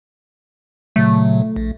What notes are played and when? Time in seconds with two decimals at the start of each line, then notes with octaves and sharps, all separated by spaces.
0.96 A#2 C#3 F#3 A3
1.56 A#1